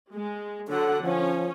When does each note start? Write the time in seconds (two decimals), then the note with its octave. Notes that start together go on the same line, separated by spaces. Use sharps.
0.12 G#3
0.68 D3 F#3 A4 F#5
1.03 F3 C#4